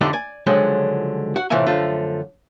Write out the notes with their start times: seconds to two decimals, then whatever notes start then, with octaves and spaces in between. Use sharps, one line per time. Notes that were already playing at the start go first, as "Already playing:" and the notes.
0.01 F2 D3 A3 D4 D#4 G4
0.13 D5 G#5
0.47 C#2 D3 F3 F#3 G#3 G5
1.36 F#4 F#5
1.50 A2 C3 E3 F4 E5 G#5
1.66 F#2 D3 F3 A3 F4